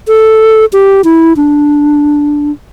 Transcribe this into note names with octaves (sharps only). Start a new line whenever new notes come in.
A4
G4
E4
D4